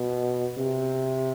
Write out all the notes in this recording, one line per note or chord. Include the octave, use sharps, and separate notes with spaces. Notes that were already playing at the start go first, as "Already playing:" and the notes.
Already playing: B2
C3